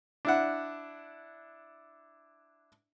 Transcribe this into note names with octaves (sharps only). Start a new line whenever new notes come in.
D4 E4 F#5